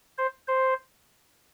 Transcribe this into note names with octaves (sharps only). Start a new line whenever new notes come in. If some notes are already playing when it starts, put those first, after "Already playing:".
C5
C5